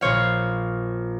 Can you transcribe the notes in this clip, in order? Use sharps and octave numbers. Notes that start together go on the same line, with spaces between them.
A#1 C5 C#5 F5